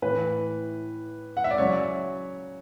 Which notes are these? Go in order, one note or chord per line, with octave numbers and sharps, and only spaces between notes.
A2 E3 B4
F#5
E5
D5
C#3 F#3 C#5